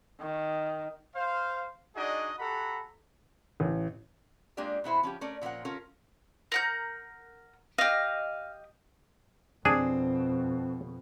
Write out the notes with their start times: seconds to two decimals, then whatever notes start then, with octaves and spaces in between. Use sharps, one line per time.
0.21 D#3
1.15 C5 F5
1.96 D4 D#4 F#4 G#4 D5 D#5
2.39 F#4 G4 A4 F#5 A#5 B5
3.60 A1
4.57 G#3 A#3 D4 F4 G4 D5
4.84 B2 B3 E4 C5
5.03 F3 C#4 F4 G4
5.21 A3 C#4 A#4 D5
5.41 A#2 F3 C#4 A#4 F#5
5.65 C#4 F4 A4 A#4
6.52 A#4 F#5 G6
7.78 G4 D#5 F5
9.65 F2 B2 C4 D4 G#4